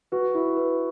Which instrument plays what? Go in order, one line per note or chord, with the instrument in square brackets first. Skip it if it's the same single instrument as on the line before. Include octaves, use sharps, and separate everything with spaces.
[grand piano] F#4 [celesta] B4
[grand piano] E4
[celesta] B4